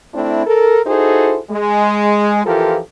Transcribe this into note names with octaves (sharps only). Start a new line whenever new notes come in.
A3 C4 D4 E4
A4 A#4
D#4 E4 F#4 G#4 A4 C5
G#3
E3 F3 F4 G4 A4 A#4